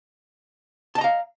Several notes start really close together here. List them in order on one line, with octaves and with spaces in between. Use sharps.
A5 D#5 A#5 F5